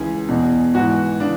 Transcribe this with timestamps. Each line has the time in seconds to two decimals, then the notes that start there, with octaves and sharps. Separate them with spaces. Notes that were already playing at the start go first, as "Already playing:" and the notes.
Already playing: C#2 C#3 E3 G#4
0.29 E2 B2
0.74 G#2 E3 F#4
1.20 C#3 E3 D4